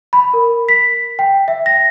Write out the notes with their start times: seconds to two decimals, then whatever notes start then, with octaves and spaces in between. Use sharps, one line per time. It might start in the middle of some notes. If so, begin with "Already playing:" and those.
0.13 B5
0.34 A#4
0.69 B6
1.19 G5
1.48 E5
1.66 A#6